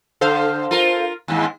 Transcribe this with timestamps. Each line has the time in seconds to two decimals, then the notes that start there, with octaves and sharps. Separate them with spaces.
0.21 D3 A4 C5 F5
0.71 F4 A#4
1.28 D#2 G#2